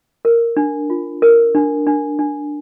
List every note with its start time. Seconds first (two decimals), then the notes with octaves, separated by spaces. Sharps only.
0.25 A#4
0.57 D4
0.90 F4
1.22 A#4
1.55 D4
1.87 D4
2.19 D4